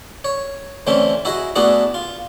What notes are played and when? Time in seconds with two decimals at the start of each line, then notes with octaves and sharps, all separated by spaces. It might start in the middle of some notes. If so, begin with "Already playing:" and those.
0.24 C#5
0.87 D3 E3 A3 C4 C#4
1.25 E4 F#4 G#4 D#5
1.56 A3 B3 D4 E4 F#4 G#4
1.94 F4